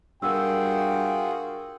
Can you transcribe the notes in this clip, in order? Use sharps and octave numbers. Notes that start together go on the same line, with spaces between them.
G2 F4 F#4 G#4 A#4 F#5 G5 E6